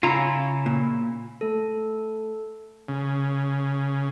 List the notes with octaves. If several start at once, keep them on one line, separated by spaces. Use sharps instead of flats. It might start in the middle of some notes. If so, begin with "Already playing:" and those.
C#3 E4 F4 A#5
A#2
A3 A4
C#3